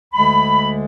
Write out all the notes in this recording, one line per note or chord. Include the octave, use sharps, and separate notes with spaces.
D2 D3 G#3 B5